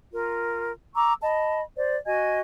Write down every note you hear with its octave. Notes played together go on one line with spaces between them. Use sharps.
F4 A#4
A#5 C#6 D6 E6
D#5 A5 B5
C5 D5
F#4 D#5 G#5 G#6